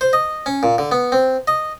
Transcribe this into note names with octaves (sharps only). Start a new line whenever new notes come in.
C5
D#5
C#4
A#2
D3
B3
C4
D#5